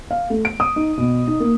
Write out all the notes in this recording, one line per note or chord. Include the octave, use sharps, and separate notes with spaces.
F5
A3
D7
D#6
D#4
B2
D#4
A#3